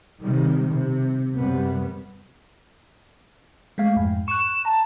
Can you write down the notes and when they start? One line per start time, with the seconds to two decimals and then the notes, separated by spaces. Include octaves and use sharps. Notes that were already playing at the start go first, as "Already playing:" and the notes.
0.22 C3 D#3 G3
0.72 C3
1.36 F#2 C3 G3 B3
3.78 G#3 A3 F5
3.96 F2 G#2
4.28 C#6 F#6 E7
4.65 A5 A#5